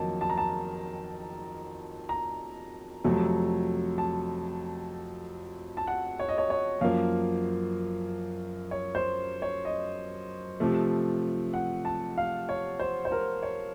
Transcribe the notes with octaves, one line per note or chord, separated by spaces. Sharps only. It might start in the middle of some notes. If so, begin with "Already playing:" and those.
Already playing: F2 D#3 F#3 A#3 A5
A5
A#5
A5
A#5
F2 C3 F#3 A3
A5
A5
F#5
C#5
D#5
C#5
C#5
F#2 F3 A#3 F5
C#5
C5
C#5
D#5
C3 F3 A3
F#5
A5
F5
C#5
C5
C5
A#4
C#5